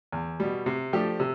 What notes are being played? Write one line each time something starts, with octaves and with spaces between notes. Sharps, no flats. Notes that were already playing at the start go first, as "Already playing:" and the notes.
E2
B2 G3
C3
F3 A3 D4 G4
C3